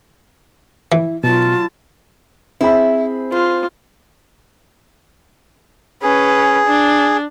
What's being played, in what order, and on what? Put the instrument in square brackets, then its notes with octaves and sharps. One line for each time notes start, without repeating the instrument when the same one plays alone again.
[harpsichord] E3 [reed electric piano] E4
[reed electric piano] B2 [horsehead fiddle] F#3 A5 [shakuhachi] F4
[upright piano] C4 G#4 B5 [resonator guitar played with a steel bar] E4
[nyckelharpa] F4 [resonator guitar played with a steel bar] C5
[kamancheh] C#4 B4 [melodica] G#4
[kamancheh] D4